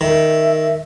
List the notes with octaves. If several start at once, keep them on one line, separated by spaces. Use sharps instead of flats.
D#3 E5